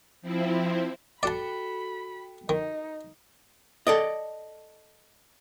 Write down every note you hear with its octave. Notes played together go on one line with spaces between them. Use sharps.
F3 C4 E4
F#4 A4 D5 G5 A5 B5
D#3 D#4
A4 D5 D#5